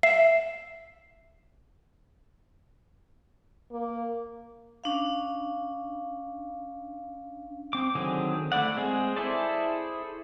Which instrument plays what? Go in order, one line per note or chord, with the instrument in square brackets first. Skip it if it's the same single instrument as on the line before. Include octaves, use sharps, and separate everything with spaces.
[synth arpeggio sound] E5 [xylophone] C7
[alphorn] A#3
[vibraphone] C#4 D4 F5
[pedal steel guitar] C4 D6
D3 D#3 F#3 C4 G#4
A3 E4 D5 F#5
G#3 C4 G#4
E4 G#4 A4 C5 D5